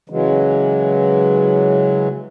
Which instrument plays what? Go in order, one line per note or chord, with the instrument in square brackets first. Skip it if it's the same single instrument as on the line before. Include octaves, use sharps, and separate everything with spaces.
[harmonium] C#3 E3 F#3 G#3